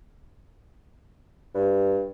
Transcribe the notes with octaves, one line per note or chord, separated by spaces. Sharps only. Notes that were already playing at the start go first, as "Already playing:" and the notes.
G2